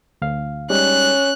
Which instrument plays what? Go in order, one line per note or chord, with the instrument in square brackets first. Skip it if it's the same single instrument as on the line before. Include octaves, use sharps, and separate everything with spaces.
[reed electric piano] D2 F5
[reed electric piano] G3 G#3 D#4 [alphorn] C#4 [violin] F#6